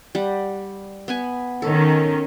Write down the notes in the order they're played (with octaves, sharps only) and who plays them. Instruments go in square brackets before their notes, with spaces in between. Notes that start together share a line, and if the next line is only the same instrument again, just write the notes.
[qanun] G3 F#5
B3 B4 G#5
[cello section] D#3 C#4 [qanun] A4